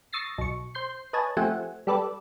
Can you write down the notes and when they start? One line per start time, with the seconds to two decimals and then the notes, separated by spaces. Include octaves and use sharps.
0.13 C#6 D#6 E6 A6 A#6 C7
0.38 B1 C#6
0.75 C5 G6 C7
1.13 B4 C#5 D#5 G#5 A5
1.37 F3 A3 C4 G4 F#5 G#5
1.87 G3 G4 A4 B4 D5